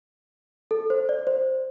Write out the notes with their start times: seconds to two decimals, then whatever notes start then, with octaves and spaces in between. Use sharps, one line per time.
0.71 A4
0.90 C5
1.09 D5
1.27 C5